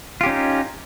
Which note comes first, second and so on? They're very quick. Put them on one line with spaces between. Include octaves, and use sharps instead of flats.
F4 G4 C#4 D#4